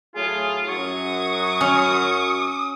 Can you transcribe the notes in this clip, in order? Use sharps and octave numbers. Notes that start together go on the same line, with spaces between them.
A2 F#3 F4 G#4
F#2 F#3 C#6 D#6
C#4